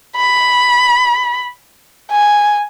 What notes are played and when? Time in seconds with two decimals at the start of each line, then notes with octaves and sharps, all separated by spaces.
0.16 B5
2.11 G#5